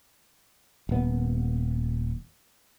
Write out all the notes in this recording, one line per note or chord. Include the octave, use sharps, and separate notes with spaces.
D#1 B3